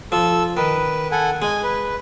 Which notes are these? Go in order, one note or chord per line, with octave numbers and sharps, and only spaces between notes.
F3 A4 E6
D#3 B4
A4 F#5 G#5
G#3 G#5
B4